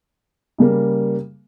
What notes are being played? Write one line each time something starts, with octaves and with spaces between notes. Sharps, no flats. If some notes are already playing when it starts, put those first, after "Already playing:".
C#3 G3 A#3